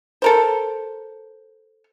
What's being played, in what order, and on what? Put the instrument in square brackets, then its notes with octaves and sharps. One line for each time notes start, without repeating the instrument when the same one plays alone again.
[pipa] A4 A#4 C5